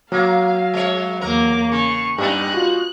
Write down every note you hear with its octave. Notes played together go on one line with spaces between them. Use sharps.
F#3 A#3 F5
G#3 C#5
E2 A#3 A#4 D6
C#3 C#6
G2 G3 B3 D#4 G4 F#6
F4 F#4